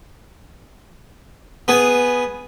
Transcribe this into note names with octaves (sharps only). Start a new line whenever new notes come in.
B3 G#4